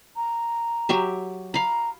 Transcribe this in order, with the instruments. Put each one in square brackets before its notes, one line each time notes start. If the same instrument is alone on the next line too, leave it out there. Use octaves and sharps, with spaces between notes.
[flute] A#5
[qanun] F#3 G4 E5
[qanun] F5 B5 [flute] A#5